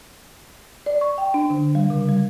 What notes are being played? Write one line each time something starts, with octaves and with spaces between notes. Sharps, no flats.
D5
C#6
G5
D4
D3
G3
C#3
G3